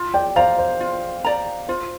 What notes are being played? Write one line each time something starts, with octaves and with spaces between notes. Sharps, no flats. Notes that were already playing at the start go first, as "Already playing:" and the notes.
Already playing: F4
D5 G5
C5 D5 F5 A#5
C5
F4
D5 A#5
F4 C5